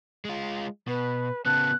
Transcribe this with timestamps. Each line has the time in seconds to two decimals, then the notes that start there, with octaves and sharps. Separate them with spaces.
0.25 G#3 F4
0.88 B2 B4
1.46 C#3 B3 A5 F#6